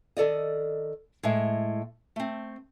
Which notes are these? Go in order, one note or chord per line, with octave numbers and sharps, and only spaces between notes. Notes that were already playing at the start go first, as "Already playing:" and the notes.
D#3 A4 D5 D#5
A2 G#3 E5
A3 C4